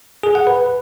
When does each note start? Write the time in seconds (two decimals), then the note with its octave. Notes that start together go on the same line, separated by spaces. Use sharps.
0.23 G#4
0.35 F#5
0.47 B4